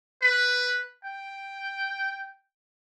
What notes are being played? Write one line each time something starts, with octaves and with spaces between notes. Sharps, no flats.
B4
G5